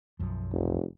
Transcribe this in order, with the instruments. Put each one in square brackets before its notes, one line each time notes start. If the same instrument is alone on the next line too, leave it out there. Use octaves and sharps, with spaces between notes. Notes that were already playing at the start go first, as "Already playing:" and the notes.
[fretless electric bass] B1 F#2 F3
[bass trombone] F1